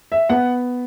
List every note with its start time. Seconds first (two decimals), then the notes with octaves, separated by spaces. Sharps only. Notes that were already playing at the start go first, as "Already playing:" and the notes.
0.12 E5
0.29 B3 F#5